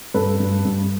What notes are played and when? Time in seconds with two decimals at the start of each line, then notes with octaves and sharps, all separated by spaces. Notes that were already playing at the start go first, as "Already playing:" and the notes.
0.14 G2 A4 B4
0.40 G2
0.65 G2